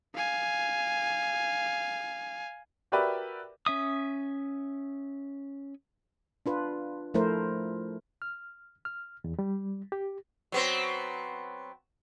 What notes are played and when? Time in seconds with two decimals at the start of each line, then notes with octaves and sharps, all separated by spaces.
0.15 F5 G#5
2.92 F#4 G4 A#4 B4 D5 E5
3.66 C#4 E5 D#6
6.46 D4 F4 B4
7.14 F3 A3 E4 A#4 C5
8.22 F6
8.85 F6
9.24 E2
9.39 G3
9.92 G4
10.52 F#3 B3 C4